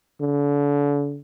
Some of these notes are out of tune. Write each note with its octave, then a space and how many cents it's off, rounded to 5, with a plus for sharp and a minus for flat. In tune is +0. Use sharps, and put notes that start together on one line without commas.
D3 -35